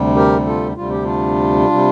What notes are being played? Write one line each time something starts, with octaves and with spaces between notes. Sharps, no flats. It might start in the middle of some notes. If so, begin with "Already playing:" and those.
Already playing: D2 C3 G3
G4 A#4
F4 A4
D2 C3 G3 F4
G4
D4 F4
C3 G3